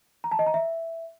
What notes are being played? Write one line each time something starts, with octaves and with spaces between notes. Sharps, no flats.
A#5
A5
D#5
A#5
E5